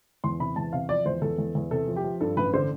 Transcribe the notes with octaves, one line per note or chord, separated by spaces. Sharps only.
E2 C6
C3 B5
E2 A5
C3 F5
F3 D5
E2 C5
E2 A4
E2
E2
C3 A4
F3
G4
F3
G2 A4
A1 B4
D3 C5